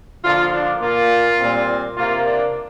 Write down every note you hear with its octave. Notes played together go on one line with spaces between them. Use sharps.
D3 F3 A#3 F4
D4
A#2 A#3 F4
A#2 G3 C4
C3 A#3 F4
D4